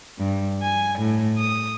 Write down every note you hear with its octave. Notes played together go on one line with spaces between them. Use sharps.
G2
G#5
A2
D#6